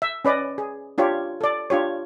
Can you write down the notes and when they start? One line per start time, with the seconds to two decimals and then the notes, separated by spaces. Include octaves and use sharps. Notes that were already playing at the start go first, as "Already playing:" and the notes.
0.02 E5
0.25 C#4 B4 D5 D#5
0.58 G#4
0.98 D4 F4 G4 C#5
1.41 A4 D5
1.70 D4 F4 G4 C#5